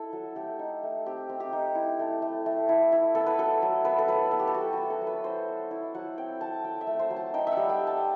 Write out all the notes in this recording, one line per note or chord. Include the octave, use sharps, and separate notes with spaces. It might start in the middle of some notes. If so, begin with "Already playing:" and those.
Already playing: E4 A4
F#3
A3 G4
D#4
A3
C4 G4
C4
G4
D#4
E4
A3
A3
A3
E4
E4
B3 A4
B4
F#3 A4
F#3
B3 B4
A4
F#3 B4
B3 A4
G4
A4
B3 F#4
B3 F#4
A4
F#3
B4
F#3 C5
B3
E4
F#3 F#5
C4 G5
F#3 A5
F#3 G5
E5
A3
C5
F#3
A5
D#4 G5
E5
F#5
G3
G5
G3
A5